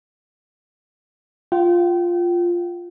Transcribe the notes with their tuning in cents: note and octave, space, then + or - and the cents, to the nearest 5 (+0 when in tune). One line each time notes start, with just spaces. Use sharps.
F4 +0 G5 -35